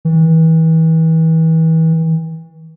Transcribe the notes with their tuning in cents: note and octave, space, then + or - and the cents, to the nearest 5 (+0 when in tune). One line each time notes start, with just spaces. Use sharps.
E3 -35